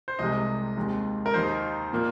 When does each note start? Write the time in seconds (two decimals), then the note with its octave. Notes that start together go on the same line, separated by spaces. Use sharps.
0.08 C5
0.19 C2 C3 G#3 D#5
0.77 D#2 D#3 G#3 C4
1.26 A#4
1.34 D#2 D#3 A#3 D#4 C5
1.93 A#2 A#3